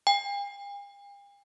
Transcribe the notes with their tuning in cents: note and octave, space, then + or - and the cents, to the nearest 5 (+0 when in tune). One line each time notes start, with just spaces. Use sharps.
G5 +45